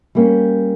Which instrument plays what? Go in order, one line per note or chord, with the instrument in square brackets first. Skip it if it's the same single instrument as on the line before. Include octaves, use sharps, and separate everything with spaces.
[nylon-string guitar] G3 A#3 C#4